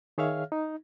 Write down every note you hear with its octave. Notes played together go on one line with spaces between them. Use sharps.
D#3 G#4 C#5 E5 F5 F6
D#4